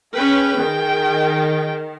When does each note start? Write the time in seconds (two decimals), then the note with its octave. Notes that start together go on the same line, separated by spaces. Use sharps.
0.15 C#4 G#4 B4 G5
0.61 D#3